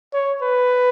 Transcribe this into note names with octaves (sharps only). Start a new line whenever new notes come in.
C#5
B4